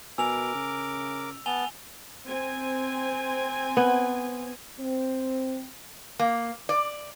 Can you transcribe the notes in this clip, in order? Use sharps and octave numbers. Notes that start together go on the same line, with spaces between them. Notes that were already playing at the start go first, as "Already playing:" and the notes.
B2 A#4 G#5 D6 E6 F7
C#3
B3 G#5 A5 F7 G7
C4 G#5
B3
C4
A#3
D5